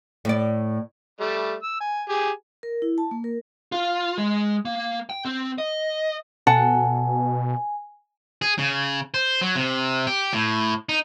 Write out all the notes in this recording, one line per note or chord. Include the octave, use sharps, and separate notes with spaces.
A2 D5
G3 A3
E6
G#5
G4 G#4 G#5
A#4
E4
A5
A#3
A#4
F4
G#3
A#3
G5
C4
D#5
B2 A4 F#5 G#5 A5
G#4
C#3
C5
F#3
C3
G4
A2
D#4